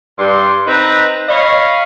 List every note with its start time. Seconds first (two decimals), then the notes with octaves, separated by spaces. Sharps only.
0.19 G2 C6
0.67 C4 D#4 B4 A#5
1.29 C#5 D#5 F5 B5